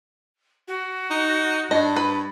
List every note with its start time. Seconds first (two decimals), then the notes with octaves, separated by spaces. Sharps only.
0.67 F#4
1.11 D#4
1.71 G2 D4 D#5
1.96 B4